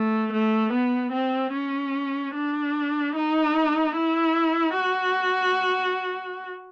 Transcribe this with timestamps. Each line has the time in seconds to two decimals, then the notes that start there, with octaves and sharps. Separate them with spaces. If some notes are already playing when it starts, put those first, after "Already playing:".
Already playing: A3
0.33 A3
0.73 B3
1.13 C4
1.54 C#4
2.35 D4
3.16 D#4
3.96 E4
4.77 F#4